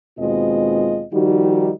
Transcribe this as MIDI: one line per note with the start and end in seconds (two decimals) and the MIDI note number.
0.19 1.03 39
0.19 1.03 47
0.19 1.03 56
0.19 1.03 60
0.19 1.03 65
0.19 1.03 75
1.12 1.70 51
1.12 1.70 53
1.12 1.70 55
1.12 1.70 63
1.12 1.70 66
1.12 1.70 67